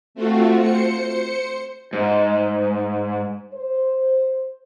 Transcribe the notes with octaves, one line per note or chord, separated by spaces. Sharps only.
A3 C4 F4 F#4
C5 C#7
G#2
C5